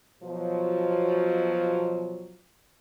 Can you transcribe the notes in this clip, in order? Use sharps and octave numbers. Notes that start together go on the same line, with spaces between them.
B2 F3 F#3